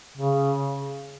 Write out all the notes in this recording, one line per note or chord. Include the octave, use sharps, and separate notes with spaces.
C#3